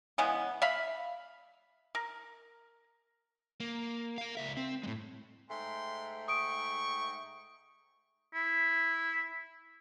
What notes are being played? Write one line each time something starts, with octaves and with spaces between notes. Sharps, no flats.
C#3 E3 G#3 B3
E5 F5 B5
A#4
A#3
A#4 F5
C#2 E5
C4
A2 G#3
G#2 A3 G5 C6
C#6 D#6 D7
E4